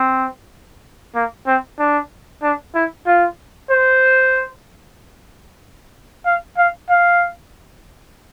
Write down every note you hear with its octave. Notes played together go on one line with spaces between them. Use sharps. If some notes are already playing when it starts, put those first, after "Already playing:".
Already playing: C4
A#3
C4
D4
D4
E4
F4
C5
F5
F5
F5